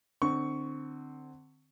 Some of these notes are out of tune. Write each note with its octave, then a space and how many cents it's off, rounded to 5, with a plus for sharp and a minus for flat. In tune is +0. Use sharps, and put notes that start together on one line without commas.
D3 +30 C4 +0 C#6 +10